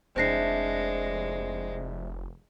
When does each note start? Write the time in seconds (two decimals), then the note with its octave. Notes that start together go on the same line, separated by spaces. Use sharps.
0.16 F1 G#3 C4 D4 E4 C5 A#6 C7